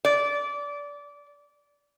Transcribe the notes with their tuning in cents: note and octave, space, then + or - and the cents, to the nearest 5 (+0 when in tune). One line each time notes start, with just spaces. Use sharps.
D5 -20